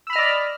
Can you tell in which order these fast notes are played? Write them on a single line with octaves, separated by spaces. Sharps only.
E6 B5 F6 D#5 D5